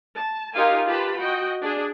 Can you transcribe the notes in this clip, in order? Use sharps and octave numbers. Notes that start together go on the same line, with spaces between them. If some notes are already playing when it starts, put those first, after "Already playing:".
A5
D#4 F4 G4 A#4 F5 G#5
F4 G4 B4 A5 B5
F#4 D#5 G5
D4 G#4